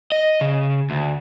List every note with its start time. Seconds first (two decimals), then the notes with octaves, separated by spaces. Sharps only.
0.12 D#5
0.41 C#3
0.90 D2